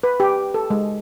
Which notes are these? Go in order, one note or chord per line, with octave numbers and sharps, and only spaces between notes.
B4
G4
A4
G#3